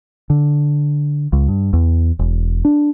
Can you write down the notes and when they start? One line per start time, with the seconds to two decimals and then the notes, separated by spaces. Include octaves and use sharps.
0.30 D3
1.33 C#2
1.48 G2
1.73 E2
2.19 E1
2.65 D4